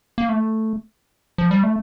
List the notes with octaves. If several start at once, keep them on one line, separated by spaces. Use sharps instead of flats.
A#3
A3
F3
G3
A3